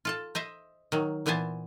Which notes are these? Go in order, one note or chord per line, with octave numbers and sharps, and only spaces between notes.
F4 A4 A5
C5 D#5 E5
D#3 F#3
A#2 E3 B3 C5 G#5 A5